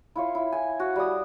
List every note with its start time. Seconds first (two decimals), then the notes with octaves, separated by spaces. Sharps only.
0.15 E4 F4 C#5
0.35 E4
0.52 G#5
0.80 F#4
0.96 G3 D#6